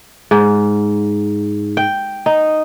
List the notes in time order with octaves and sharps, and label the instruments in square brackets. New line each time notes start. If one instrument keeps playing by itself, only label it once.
[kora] G#2
G5
D#4